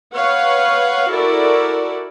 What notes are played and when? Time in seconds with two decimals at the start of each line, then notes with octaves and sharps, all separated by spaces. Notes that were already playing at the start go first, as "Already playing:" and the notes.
0.15 B4 C#5 F5 F#5
1.11 E4 F#4 A4 A#4 D5